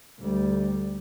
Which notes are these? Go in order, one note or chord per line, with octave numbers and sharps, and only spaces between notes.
D2 G3